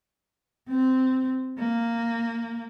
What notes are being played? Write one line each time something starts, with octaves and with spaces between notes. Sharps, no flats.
C4
A#3